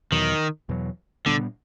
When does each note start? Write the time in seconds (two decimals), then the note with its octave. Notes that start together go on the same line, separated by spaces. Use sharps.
0.12 E2 B2 D#3 F#3
0.69 E2 B2 F#3
1.26 A#2 D3 G3 B3 D4